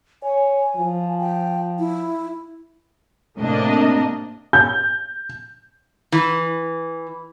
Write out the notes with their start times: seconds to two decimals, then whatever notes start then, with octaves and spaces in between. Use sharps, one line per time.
0.23 C#5 G#5
0.76 F3
1.20 G5
1.79 E4
3.37 A2 C3 A#3 D4 D#5
4.53 G6
6.12 E3